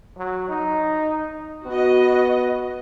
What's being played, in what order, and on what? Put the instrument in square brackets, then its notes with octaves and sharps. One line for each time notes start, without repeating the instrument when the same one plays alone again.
[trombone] F#3
D#4
[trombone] B3 [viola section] F#4 D#5